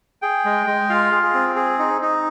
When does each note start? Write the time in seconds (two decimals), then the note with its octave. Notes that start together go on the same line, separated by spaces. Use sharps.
0.22 G#4 G5
0.45 G#3
0.67 G#3
0.89 F4 F5
1.12 G#4
1.23 G#4
1.34 C4
1.56 G#4
1.79 D#4
2.02 D#4